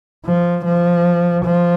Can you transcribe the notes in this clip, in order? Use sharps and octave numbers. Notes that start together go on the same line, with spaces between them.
F3
F3
F3